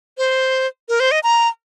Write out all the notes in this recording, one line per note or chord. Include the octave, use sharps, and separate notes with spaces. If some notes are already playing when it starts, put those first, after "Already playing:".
C5
A#4
C5
D#5
A#5